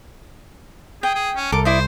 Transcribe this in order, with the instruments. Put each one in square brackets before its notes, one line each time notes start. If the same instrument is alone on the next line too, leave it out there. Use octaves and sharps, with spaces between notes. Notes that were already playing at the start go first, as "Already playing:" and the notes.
[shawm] G#4 [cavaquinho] G5
[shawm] G#4
C#4
[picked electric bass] C2 [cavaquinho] A4 A#4 [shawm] D6
[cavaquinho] E4 D5 D#5 [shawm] C5